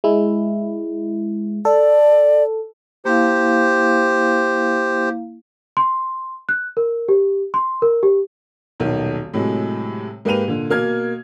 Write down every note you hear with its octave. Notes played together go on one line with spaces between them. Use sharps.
G#3 E4
A4 D5
A#3 E4 G4 C5 F5
C6
F#6
A#4
G4
C6
A#4
G4
D#1 B1 D#3
A2 C3 F#3 G#3
G#2 A#3 G4 B4 D#7 F7
A#2 D3
B2 A#3 F6 G#6